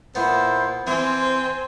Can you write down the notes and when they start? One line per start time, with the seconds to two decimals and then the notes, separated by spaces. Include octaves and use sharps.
0.15 A#2 B3 E4 C5
0.87 E3 C4 C5 G#5